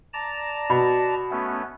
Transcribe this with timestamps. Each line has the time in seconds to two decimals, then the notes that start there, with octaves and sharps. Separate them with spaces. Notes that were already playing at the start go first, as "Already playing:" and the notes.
0.13 D5 A5 A#5
0.70 B2
1.31 A3 B3 C#4